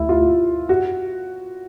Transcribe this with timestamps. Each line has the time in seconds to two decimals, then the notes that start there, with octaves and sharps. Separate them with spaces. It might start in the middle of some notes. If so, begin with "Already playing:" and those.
Already playing: D2 A3 E4
0.09 F4
0.69 F#4